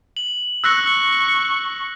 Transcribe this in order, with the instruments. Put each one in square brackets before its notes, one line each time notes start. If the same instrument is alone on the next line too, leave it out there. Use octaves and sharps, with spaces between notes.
[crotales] F#7
[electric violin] C#6 [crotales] E6 F#6 A#6